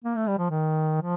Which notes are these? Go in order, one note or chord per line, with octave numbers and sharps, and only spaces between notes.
A#3
A3
G3
F3
D#3
F3